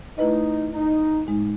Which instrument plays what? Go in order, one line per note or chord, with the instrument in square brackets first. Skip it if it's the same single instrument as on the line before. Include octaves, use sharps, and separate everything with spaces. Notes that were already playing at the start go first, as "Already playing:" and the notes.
[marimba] A3 E4 B4 D#5 [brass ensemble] D#4
[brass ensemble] D#4
[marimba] A2 G#3 D#4